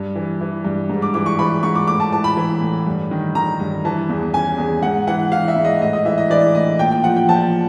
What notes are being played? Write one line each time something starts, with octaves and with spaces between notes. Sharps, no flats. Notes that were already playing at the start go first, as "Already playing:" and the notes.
Already playing: G2
E3
E3
G2
G#2
D6
E3 D6
C#6
E3 B5
G#2 C#6
D6
A2 D6
A5
E3 A5
B5
E3
A2
G2
D#3
D#3 A#5
G2
E3 A5
E2
C#3 G#5
E2
G#2 F#5
E3 F#5
E3 F5
E5
G#2
D#5
A2 D#5
D#5
E3 E5
D#5
E3 D5
A2 D#5
A#2 G5
G5
F3 F#5
G5
F3 A5